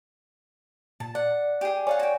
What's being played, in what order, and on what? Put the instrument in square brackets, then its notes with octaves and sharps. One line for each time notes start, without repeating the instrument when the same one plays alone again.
[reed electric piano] A#2 [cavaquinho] A5
[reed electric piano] D5 [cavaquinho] F#5
[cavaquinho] G4 G#4
[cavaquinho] A4 F5 F#5 [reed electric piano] C#5 D5 G#5
[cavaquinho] F#4 G5